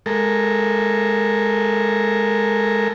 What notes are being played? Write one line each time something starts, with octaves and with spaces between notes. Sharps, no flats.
G#3 A4 A#4